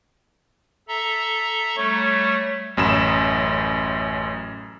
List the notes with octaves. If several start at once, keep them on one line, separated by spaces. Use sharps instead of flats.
A4 E5 A#5
G3 A3 C#5
A1 F#2 B5 E7